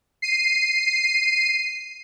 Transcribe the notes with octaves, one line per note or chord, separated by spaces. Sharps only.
C7 D#7